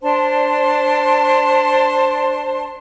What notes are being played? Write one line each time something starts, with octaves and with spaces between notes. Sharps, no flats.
D4 C5 A5 C6